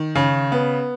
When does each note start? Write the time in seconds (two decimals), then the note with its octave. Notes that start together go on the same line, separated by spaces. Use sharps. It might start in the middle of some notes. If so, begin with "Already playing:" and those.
Already playing: D#3
0.15 C#3
0.52 B3